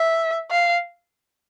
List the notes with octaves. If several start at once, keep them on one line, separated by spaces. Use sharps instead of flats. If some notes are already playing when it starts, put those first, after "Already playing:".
Already playing: E5
F5